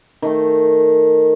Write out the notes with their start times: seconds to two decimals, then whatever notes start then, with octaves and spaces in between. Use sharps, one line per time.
0.22 D#3 A3